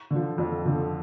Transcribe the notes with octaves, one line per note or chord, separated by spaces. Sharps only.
D3 F3
F2
D3 F3